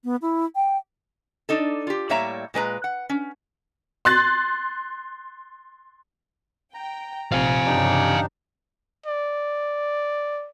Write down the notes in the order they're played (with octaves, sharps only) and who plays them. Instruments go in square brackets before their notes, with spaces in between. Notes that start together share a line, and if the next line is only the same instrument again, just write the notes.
[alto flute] B3
E4
G5
[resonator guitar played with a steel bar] D4 D#4 A4
F4 G4
A2 G3 A#3 C#5 E5 A#5
A#2 G#3 B4 A#5
F#5
C#4
[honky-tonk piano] C6 F#6 A6
[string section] G5 [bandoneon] A#5
[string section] A#1 [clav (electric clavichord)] C3 F3 [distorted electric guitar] F5 G#5
[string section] G2 C#3 E3 [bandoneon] D4 D#4 G4
[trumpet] D5